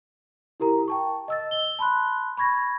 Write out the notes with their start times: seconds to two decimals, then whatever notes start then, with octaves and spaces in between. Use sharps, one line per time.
0.60 E4 G4 A#4 A#5
0.88 G5 A5 C#6
1.28 D#5 E6 A6
1.51 G7
1.79 A5 B5 C6 F#6
2.37 B5 C#6 G#6 A#6